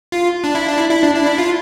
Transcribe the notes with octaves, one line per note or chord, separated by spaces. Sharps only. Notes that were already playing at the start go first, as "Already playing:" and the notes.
F4
D4
E4
D4
E4
E4
D4
D4
E4
F4